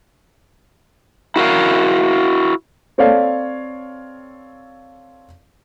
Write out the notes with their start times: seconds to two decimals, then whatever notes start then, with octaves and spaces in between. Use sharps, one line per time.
1.36 E4 F#4 A#4 F5
2.98 C4 A4 C#5 D5 F5